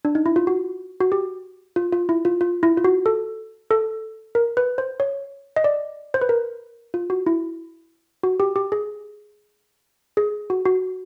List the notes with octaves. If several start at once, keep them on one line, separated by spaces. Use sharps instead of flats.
D4
D#4
E4
F4
F#4
F#4
G4
F4
F4
E4
F4
F4
E4
F4
F#4
A4
A4
A#4
B4
C5
C#5
D#5
D5
C5
B4
A#4
F4
F#4
E4
F#4
G4
G4
G#4
G#4
F#4
F#4